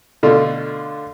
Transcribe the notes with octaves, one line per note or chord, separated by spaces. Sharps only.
B2 D3 A3 F4